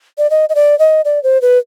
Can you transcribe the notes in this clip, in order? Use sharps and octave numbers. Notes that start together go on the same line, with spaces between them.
D5
D#5
D#5
D5
D#5
D5
C5
B4